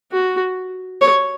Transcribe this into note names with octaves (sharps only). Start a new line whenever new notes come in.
F#4
C#5